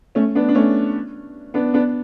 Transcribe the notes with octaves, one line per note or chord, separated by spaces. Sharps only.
A3 C#4
B3 D4
D4
A3 C#4
B3 D4
B3 D4